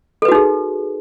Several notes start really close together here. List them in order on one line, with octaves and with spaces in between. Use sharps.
A4 B4 F#4 D#4 G#4